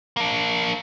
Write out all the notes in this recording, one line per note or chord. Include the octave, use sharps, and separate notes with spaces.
A#3 D4